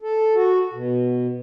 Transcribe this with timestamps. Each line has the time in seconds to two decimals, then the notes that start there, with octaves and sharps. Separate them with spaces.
0.02 A4
0.35 F#4
0.73 B2